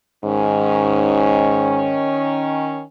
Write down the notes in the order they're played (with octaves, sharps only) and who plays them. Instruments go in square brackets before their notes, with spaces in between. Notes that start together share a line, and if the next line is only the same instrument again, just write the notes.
[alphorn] G#2 [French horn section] D#3 C#4